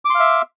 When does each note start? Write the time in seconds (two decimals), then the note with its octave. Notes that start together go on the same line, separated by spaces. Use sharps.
0.05 D6
0.10 C6
0.15 F5
0.20 E5